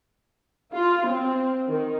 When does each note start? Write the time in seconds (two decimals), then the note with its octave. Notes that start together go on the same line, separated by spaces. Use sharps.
0.74 F4
1.07 C4
1.69 D#3